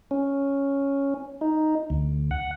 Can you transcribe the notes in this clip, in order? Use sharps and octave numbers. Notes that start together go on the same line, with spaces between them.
C#4
D#4
D2
F#5